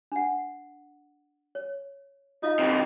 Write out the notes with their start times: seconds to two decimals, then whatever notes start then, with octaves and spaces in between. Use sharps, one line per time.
0.12 D4 F#5
1.55 C#5
2.43 D#4 F4 E5 F5
2.59 C3 E3